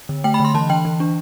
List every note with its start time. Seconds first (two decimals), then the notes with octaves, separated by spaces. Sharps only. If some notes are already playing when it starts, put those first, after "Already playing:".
0.09 D3
0.24 A3 G5
0.34 B5
0.40 D3
0.45 C6
0.54 E3 A5
0.70 E3 G5
0.85 E3
1.00 D4